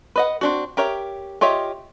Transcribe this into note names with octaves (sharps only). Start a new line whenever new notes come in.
B4 D#5 F#5
C4 D4 F#4
G4 A#4 C#5 E5
F4 G4 C#5 D#5 E5